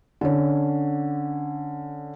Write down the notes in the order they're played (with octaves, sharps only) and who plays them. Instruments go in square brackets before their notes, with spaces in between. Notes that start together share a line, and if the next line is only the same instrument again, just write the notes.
[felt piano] D3 C#4